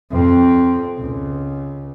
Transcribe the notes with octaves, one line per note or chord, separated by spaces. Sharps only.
F2 C4
C#2